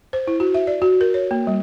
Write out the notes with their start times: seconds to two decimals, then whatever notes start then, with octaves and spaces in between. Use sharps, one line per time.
0.13 C5
0.27 E4
0.40 F#4
0.54 E5
0.67 D5
0.82 F#4
1.01 A#4
1.14 C#5
1.31 A#3
1.47 G3